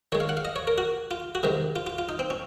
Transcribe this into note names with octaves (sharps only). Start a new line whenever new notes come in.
D#3 G#3 C#5
F5
F#5
F5
D#5
C#5
A#4
F#4
F4
F#4
C3 D#3 G#3
F4
F4
F4
D#4
C4
C#4